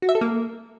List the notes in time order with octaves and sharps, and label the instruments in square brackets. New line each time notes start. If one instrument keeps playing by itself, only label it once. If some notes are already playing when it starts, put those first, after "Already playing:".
[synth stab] F#4
E5
A4
A#3